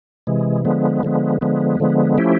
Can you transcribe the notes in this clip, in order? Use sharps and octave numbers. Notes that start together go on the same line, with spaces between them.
C3 E3 G#3
D3 F3 G#3 B3
D3 F3 G#3 B3
D3 F3 G#3 B3
D3 F3 G#3 B3
F3 A3 C#4 E4 G4